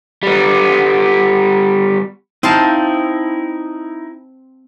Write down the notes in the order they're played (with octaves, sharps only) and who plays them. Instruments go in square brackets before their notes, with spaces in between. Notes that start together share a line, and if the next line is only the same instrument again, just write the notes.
[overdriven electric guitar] G3 B3
[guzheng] C4 F5 A5 [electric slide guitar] D#4 E4